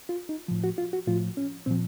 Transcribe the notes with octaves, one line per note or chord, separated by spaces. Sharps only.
F4
D#4
A2 F3
F#4
F4
F#4
A2 F3 F4
C#4
A#2 F3 C4